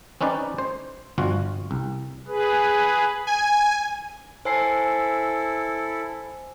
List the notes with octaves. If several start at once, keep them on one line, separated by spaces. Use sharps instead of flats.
C4 C#4 D#4 B4 D5
C5
G1 F3 F4 F#4
C2
G#4 B4
G#5
E4 A4 C5 G#5 C7